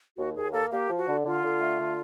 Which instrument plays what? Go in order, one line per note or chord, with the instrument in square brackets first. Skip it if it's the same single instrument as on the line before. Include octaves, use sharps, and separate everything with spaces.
[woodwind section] D#2 [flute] F#4
[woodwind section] D#2 [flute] G#4
[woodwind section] A#3 [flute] A4
[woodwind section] A#3 [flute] G4
[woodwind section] F3
[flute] F#4
[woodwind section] D3
[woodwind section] D3 [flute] F4
[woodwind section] D3
A3
D3